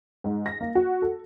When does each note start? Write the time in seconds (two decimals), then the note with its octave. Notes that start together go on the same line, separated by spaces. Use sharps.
0.24 G#2
0.46 A#6
0.61 A#3
0.75 F#4
1.02 A4